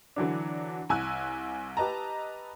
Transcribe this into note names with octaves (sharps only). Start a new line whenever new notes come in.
D3 E3 F#3 D4
C2 G#5 E6 F#6
G4 B4 D#5 A5 A#5